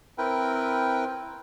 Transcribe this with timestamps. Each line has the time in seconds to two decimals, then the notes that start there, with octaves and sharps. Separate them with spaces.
0.18 C4 E4 A#4 B4 G5